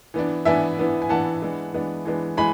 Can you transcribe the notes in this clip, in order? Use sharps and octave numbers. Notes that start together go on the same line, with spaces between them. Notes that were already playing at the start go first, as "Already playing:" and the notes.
E3 B3 D4
E3 B3 D4 E5 G#5
E3 B3 D4
G#5
E3 B3 D4 F#5 A5
E3 G#3 B3 D4
E3 G#3 B3 D4
E3 G#3 B3 D4
E3 G#3 G#5 B5